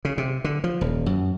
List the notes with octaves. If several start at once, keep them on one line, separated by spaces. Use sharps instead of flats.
C#3
C3
D3
F3
D#1
F#2